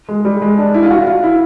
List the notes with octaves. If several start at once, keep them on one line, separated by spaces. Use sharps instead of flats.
G#3
G3
G#3
D4
E4
F4
F#4
F4
E4